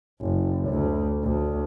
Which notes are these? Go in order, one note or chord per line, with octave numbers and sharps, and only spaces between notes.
F#1
D2
D2